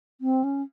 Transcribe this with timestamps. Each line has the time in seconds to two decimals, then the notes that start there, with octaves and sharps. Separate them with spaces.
0.21 C4
0.44 C#4